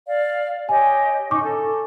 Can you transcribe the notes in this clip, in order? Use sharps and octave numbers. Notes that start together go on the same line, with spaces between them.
D5 F5
G4 C#5 D#5 G#5
C#4 D#4 G#5 C#6 D6
A4